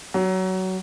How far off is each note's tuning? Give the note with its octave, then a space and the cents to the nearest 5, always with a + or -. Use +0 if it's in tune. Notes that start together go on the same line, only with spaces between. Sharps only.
F#3 +20